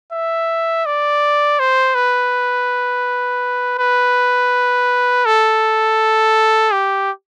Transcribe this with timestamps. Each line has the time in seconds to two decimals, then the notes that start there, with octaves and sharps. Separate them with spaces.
0.13 E5
0.86 D5
1.59 C5
1.95 B4
3.79 B4
5.26 A4
6.72 G4